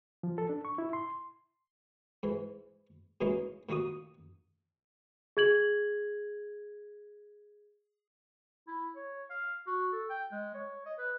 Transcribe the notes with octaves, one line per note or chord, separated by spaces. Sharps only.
F3
A4
D4
C#6
E4
C6
G#2 E3
B2 E3 G#3 A#3 C#4 D#4
A#2 D#3 A#3 F#4 D#6
G#4 G#6 F#7
E4
C#5
F5
F#4
A4
G5
G#3
C#5
D#5
B4